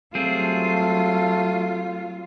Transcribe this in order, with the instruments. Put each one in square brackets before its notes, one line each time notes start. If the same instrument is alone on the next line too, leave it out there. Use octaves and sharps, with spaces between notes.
[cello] F#3 F4 [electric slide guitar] G3 C4 G#4 [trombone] A3